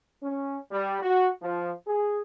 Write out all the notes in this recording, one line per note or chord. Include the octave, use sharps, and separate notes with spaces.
C#4
G3
F#4
F3
G#4